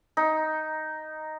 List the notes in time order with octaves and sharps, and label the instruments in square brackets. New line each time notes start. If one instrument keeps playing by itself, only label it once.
[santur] D#4